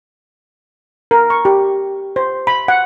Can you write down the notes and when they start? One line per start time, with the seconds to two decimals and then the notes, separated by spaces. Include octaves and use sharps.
1.11 A#4
1.30 C#6
1.45 G4
2.16 C5
2.47 B5
2.68 F#5